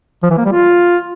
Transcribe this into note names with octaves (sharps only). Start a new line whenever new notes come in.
F3
E3
A#3
G3
F4